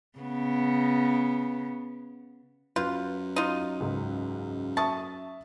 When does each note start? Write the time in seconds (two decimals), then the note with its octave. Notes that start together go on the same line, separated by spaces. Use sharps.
0.19 C#3 B3
2.76 F#2 F4 B4 G6
3.36 D#4 F4
3.80 C#2 G#2
4.77 E5 A5 C#6 D#6